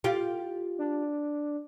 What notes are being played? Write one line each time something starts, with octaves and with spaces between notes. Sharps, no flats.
F4 G4
D4